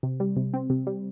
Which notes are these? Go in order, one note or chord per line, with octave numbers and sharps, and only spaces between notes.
C3
G3
C3
C4
C3
G3